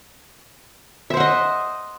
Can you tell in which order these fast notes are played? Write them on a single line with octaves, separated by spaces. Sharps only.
E5 C5 F#5 D#5